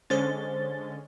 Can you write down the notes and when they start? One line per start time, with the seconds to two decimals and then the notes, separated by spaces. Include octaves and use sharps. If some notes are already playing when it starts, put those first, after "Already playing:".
0.10 D3 G#3 C#4 C5 A6